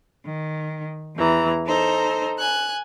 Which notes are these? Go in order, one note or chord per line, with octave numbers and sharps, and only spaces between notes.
D#3
E2 E3 A#5
D#4 A4 C5 A#5
G#5 F#6